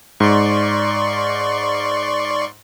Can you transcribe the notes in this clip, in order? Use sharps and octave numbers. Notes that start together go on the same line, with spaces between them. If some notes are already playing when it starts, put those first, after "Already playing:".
G#2 D5 C6 C#6